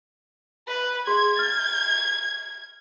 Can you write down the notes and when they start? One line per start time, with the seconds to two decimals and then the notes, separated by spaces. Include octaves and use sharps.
0.67 B4
1.07 G#4 C6 G#6
1.37 F6 A6